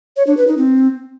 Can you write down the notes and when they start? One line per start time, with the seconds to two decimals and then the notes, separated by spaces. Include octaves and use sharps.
0.17 C#5
0.27 D4
0.37 B4
0.47 D#4
0.58 C4